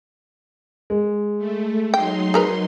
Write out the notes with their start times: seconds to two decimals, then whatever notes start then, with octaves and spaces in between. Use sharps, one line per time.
0.90 G#3
1.38 A3
1.94 F#3 D#4 G5 C6
2.34 G#4 A#4 B4